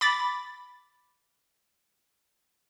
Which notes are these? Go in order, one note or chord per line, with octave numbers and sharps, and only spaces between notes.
B5 D6 A6